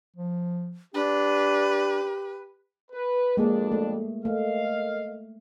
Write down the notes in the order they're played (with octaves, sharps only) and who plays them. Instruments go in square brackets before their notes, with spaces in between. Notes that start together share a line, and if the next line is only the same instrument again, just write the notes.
[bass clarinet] F3
[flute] D4 [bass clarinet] G4 [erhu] B4
[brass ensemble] B4
[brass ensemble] A1 F2 D4 [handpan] G#3 A#3 G#4
[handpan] A3
[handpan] A3 [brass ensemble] A#4 D#5 F5